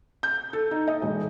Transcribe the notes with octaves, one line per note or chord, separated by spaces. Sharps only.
G6
A4
D#4
D#5
E1